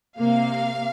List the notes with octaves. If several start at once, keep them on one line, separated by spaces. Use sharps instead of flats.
C3 A#3 F5